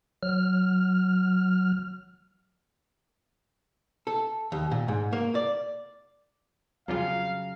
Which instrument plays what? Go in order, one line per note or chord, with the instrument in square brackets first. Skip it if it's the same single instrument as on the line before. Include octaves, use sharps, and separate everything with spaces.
[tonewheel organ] F#3 F6
[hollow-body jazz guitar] A4
D#2
A#2
G#2
A#3
D5
[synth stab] F2 G3 F4 [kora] C#3 F#3 [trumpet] F5